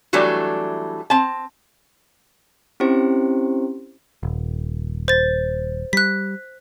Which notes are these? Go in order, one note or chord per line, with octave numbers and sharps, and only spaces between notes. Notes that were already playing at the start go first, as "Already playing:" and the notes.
E3 F#3 G3 A3 D4
C4 A5
C4 C#4 E4 G4 C5
D#1
C5 A6
G3 F#6 B6